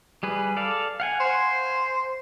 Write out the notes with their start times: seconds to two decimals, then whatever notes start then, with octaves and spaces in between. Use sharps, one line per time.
0.23 G3 G#4 B4
0.57 A4 D5 F5
1.00 F5 F#5 G#5
1.20 C5